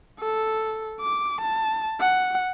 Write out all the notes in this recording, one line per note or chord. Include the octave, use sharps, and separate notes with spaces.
A4
D6
A5
F#5